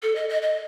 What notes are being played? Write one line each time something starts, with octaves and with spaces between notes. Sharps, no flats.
A4
D#5
D#5
D#5